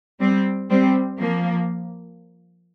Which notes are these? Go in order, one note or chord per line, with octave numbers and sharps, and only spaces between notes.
G3 C4
G3 C4
F3 A#3